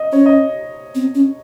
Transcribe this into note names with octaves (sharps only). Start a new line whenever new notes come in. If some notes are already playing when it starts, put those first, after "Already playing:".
Already playing: D#5
C#4 C#5
D#5
C4
C#4